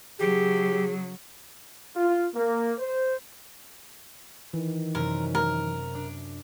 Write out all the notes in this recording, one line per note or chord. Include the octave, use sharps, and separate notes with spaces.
C#3 F#3 G4 G#4
F4
A#3
C5
D#3 E3
F#2 C3 C#4 A#4
A#4
D4 D5